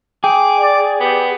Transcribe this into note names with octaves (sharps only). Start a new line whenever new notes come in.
G#4 G5 D6
D5
B3 G4